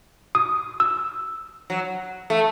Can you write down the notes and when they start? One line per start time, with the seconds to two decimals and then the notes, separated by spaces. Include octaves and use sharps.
0.35 D#6
0.80 E6
1.70 F#3
2.30 A3